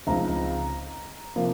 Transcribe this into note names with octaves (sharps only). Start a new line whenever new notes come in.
C#2 C#3 F3 C4 D#4 A#5
C3 F3 A#3